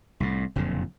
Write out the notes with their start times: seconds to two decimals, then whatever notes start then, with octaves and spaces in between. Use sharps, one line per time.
0.20 C2 A2
0.56 F#1 F2 A#2 D3